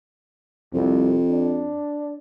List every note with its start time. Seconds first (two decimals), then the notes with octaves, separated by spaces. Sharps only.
0.74 C2 F2
1.30 D4